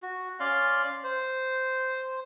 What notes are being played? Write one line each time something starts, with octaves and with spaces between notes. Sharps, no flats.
F#4
C#4 D5 F5 C6
C5